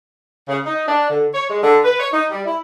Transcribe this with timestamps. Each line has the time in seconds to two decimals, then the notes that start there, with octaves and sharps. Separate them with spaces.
0.48 C#3
0.65 D#4
0.87 D4
1.09 D3
1.34 C#5
1.49 G#3
1.63 D3
1.85 B4
2.00 C#5
2.13 D#4
2.30 G3
2.45 E4